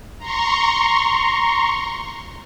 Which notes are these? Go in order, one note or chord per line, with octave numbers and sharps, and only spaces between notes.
A#5 C6 C#6